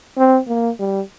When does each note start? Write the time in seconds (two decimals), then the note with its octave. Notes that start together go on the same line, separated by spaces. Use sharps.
0.17 C4
0.48 A#3
0.79 G3